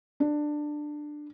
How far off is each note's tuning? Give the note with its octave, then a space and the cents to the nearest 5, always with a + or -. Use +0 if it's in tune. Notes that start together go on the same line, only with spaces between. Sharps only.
D4 +15